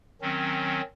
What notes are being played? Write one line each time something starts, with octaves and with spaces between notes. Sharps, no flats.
D#3 F#3 C4 C#4